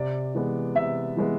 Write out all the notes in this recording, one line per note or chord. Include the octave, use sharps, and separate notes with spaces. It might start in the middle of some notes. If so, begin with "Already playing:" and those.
Already playing: C3 D5
E3 G#3 B3
C3 E5
E3 G#3 B3